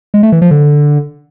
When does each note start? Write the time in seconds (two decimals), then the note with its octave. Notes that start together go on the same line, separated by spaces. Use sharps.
0.14 G#3
0.23 A3
0.32 E3
0.42 F3
0.51 D3